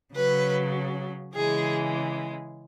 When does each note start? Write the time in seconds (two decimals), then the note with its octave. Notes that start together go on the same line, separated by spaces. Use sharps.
0.14 C#3 F#3 B4
1.35 C#3 E3 G#3 G#4